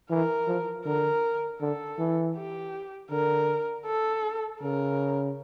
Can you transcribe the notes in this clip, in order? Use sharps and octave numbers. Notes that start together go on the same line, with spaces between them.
E3 A#4
F3
D3 A#4
D3 A4
E3
G4
D3 A#4
A4
C#3 A#4